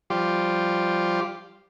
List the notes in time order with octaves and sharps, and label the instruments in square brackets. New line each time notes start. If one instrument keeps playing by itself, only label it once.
[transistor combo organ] F3 G3 F4 G4